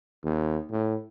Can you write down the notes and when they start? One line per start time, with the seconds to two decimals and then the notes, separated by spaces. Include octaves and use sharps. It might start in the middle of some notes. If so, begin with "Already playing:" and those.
0.24 D#2
0.71 A2